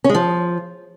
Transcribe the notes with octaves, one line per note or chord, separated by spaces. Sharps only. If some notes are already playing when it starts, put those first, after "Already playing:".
C#4
G#3
F3